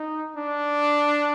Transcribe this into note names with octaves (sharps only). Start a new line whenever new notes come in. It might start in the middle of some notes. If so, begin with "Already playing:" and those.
Already playing: D#4
D4